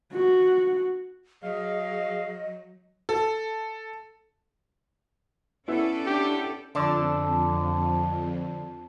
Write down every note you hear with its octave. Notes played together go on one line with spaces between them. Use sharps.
F#4
F#3 G#4 D#5 F5
A4
B3 C#4 E4 A4 D5
D4 G4
F2 D3 D4 A4